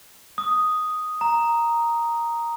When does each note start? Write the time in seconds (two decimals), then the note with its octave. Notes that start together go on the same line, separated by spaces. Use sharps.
0.38 D#6
1.21 A#5